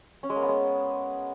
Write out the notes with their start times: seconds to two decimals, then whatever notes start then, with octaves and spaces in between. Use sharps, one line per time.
0.23 C#4
0.30 G#3
0.36 A#3
0.42 B3
0.49 G#3